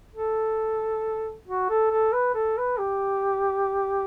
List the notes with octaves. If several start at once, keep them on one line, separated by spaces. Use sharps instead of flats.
A4
F#4
A4
A4
B4
A4
B4
G4